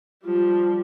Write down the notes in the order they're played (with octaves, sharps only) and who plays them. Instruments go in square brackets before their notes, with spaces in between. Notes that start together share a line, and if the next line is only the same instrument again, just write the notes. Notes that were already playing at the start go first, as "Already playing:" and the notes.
[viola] F3 G3